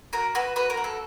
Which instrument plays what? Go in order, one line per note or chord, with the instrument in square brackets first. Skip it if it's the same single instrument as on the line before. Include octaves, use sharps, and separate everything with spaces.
[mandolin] F#4 A#4
F#4 B4
F#4 B4
A#4
F#4
A4